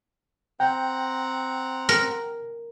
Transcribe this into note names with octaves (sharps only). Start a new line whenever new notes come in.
C4 F#5 G5 A#5
A#4